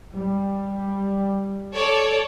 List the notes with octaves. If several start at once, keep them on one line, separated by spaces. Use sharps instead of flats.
G3
A4 C#5 D5